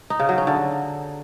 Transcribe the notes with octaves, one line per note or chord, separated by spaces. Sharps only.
D#4
C#3
F#3
C#4
D3